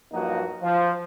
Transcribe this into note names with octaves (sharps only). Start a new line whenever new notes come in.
G2 F3 F#3 A#3 D#4 F#4
F3